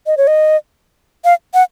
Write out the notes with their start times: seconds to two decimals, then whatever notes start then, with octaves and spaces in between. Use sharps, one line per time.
0.07 D#5
0.17 C#5
0.27 D#5
1.25 F5
1.54 F#5